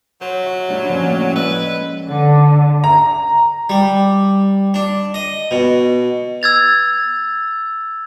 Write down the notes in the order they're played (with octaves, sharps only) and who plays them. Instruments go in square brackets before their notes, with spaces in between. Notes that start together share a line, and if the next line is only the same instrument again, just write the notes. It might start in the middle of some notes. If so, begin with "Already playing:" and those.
[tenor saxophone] F#3 [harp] C5
[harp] F#4 E5
[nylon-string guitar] G3 D4 [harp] A3 E4
[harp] F3 A#3 C#4 [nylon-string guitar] C5 D5
[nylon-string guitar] A2 C#3 C#5
[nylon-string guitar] G#3 [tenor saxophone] B4 [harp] D5 E6
[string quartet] D3
[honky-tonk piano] A#5
[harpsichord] G3
D4
D#5
B2
[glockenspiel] E6 G#6 A6 F7